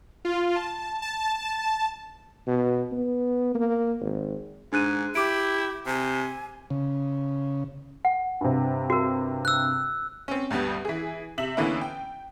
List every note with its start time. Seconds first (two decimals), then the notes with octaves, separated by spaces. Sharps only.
0.25 F4
0.56 A5
1.02 A5
2.47 B2
2.92 B3
3.55 A#3
4.01 G#1
4.73 G#2 D4 F#6 D#7
5.15 E4 G4 D6 D7
5.86 C3 G#5
6.70 C#3
8.05 F#5
8.41 G2 C3
8.90 F#4 A#4
9.45 E6 F#6
10.28 C4 C#4
10.50 D2 G2 G3 B3
10.85 E3 G#4
11.38 C3 E5 F#7
11.57 D3 E3 A#3 B3 C#4 E4
11.81 G5